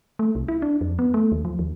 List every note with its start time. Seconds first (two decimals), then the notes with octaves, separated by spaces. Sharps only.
0.19 A3
0.35 C2
0.48 E4
0.62 D4
0.81 F2
0.99 B3
1.14 A3
1.32 D#2
1.45 F3
1.59 D#2